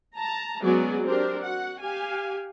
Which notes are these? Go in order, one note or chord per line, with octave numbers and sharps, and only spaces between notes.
A5 A#5
F#3 G#3 B3 C#4 G#4 D5
C4 D4 G4 A#4 C5
F#4 F#5
G4 F5 G#5